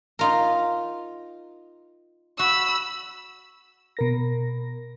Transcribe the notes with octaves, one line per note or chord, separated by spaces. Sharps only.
D#4 F4 A#4
F#4 B5 E6
B2 A#4 A#6